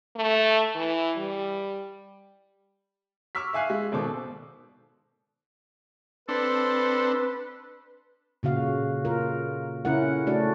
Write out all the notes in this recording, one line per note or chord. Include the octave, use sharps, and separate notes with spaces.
A3
E3
G3
C#6 D6 E6 F6 B6
E5 F5 G#5 F#6 C7
G#3
G#1 B2 A4 C5 D6
C4 D4 A4 B4
A#2 C#3 F#4 F5
F4 A#4
C#3 C#4 E4 A#4 F#5
A3 D4 F#4 D5